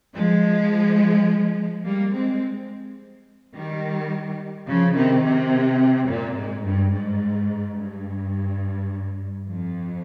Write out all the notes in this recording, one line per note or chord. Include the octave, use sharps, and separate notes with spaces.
F3 G#3
G3 A#3
G#3 C4
D#3 G3
C#3 F3
C3 D#3
C3
A#2
G#2
G2
G#2
G2
F2